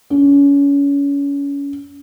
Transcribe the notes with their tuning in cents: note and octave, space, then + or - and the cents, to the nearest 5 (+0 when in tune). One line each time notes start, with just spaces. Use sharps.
C#4 +30